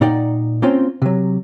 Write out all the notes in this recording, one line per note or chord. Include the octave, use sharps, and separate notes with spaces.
A#2 D#4 D5 F#5 G5
A#3 C4 C#4 F4 C5 G5
C3 F#3